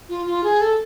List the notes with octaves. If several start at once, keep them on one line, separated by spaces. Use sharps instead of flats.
F4
F4
G#4
A4